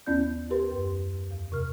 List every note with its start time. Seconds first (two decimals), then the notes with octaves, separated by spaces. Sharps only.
0.07 D#2 B3 C#4 E4 D5 G6
0.50 G4 A#4 B4 C6
0.71 F#2
1.31 E2
1.52 C3 A#4 F6